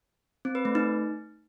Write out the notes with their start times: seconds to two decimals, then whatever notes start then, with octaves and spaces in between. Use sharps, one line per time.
0.45 C4
0.55 B4
0.65 A3
0.75 D#4